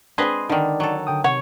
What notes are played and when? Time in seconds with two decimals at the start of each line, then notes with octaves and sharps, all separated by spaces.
0.18 G#3 C4 D4 G#4 B4 D#5 C6
0.49 D3 D#3 D#4 D5
0.80 F#3 A4
1.07 D3 G5 D#6
1.24 C3 C#5 F#5